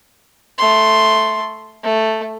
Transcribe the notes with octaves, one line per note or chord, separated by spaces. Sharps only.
A3 C6
A3